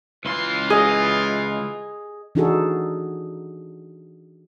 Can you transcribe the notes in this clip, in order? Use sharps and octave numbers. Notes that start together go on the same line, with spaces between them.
C#2 E3 F4 C6
G#4 D#5
E3 D4 D#4 F#4 G#4 A4